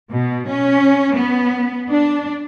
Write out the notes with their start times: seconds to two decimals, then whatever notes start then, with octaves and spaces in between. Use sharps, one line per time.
0.11 B2
0.49 C#4
1.16 B3
1.89 D4